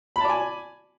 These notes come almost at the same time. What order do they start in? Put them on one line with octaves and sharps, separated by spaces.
B5 A5 D5 G#5